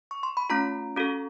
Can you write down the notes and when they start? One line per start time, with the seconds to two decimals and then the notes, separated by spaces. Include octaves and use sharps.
0.11 C#6
0.23 C6
0.37 B5
0.50 A3 C#4 F4 A#5
0.96 C#4 F#4 A4